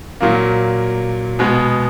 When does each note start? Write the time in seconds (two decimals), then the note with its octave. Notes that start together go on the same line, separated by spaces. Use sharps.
0.21 A#2 F#3 A#3
1.39 B2 G#3 B3